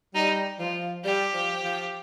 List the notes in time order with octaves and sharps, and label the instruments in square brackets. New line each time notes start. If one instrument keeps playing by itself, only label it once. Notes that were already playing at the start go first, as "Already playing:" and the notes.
[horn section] G3 [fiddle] D#4
[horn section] F3 [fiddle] F4
[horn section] G3 [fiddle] G4
[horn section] F3
F3